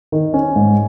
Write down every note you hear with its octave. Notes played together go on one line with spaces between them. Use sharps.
D#3
C#4
G#2